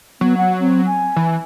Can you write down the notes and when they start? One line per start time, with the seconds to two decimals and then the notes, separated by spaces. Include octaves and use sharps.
0.21 F#3 B3
0.37 F#5
0.60 C4
0.86 G#5
1.16 E3